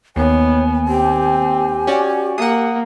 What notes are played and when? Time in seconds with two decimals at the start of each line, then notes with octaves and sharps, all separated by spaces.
0.16 D#2 B3 C#5 G#5
0.88 C4 G4
1.87 C#4 F#4 D5
2.38 A#3 F#5 D#6